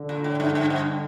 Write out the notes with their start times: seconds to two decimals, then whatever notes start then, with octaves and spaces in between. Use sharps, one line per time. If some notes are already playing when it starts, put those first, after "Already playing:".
Already playing: D3
0.09 A#2
0.24 A2
0.40 G2
0.55 G2
0.70 G2